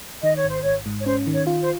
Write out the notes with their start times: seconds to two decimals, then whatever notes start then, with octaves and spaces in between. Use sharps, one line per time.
0.23 D#3 D#5
0.36 C#5
0.44 G#1
0.49 C5
0.62 G#1 C#5
0.86 G#2
1.00 C#5
1.06 C#4 C5
1.27 D#3
1.33 C#5
1.47 F4
1.61 C5